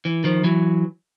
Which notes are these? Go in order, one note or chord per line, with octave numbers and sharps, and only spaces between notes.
E3
D#3 F3
E3 F#3